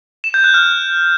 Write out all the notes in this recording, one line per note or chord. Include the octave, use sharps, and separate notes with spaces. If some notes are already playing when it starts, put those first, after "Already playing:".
E7
G6
F#6
F6